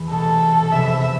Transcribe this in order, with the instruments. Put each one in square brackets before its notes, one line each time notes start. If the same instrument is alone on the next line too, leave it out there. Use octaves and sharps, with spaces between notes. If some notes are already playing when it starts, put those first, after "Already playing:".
Already playing: [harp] E2 E3 E4
[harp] C2 B2 A3 [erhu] A4
[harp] F1 E2 C3 F3 B3 [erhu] E5